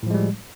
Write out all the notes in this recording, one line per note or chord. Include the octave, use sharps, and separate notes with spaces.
A2 F3 G3 G#3